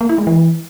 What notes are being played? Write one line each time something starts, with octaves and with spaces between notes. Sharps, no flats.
A#3
E4
G#3
E3